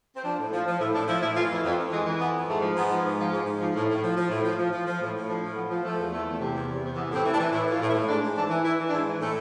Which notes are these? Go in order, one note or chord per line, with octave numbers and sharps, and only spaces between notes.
C4
F3 D4
A2
F3
F3
A2 E4
A2 D4
F3 E4
A2 E4
E3 F4
F2 E4
F2
F2
E3 G#3
E3
F2 B3
F2
G#2 A3
F3
G#2 B3
F3
G#2
F3
G#2
G#2
F3
A2
A2
F3
F3
A2
F3
F3
F3
F3
A2
A2
F3 D4
A2
F3 B3
F3
F3 A3
E2
E2 A3
E2
C3
E2
E2
C3
E3 B3
A2 C4
E3
D4
E3
A2 E4
E3 F4
A2
E4
A2
G#2 D4
G#2
E3 D4
E3
E3 E4
E3
D4
G#2 E4
E3
A2 A3